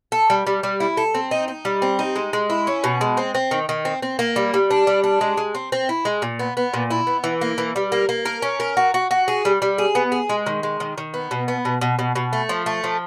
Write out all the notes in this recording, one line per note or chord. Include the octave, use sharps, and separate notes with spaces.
A4
G3
G3
G3
E4
A4
C4
D#4
D#4
G3
C4
D#4
G#3
G#3
E4
C#4
B2
G#3
C4
C4
D#3
D#3
C4
C4
A#3
G3
G3
D4
G3
D4
G#3
G#3
C4
C4
E4
G#3
A#2
B3
B3
A#2
E4
B3
E3
A#3
E3
G3
A#3
A#3
A#4
C#4
A#4
F#4
F#4
F#4
G#4
G3
G3
G#4
B3
G#4
G#3
D#3
G#3
D#3
D#3
B3
B2
B3
B2
B2
B2
B2
A3
F3
A3
F3